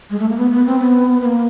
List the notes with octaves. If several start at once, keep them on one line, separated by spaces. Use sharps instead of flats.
G#3
A3
A#3
B3
B3
C4
B3
B3
A#3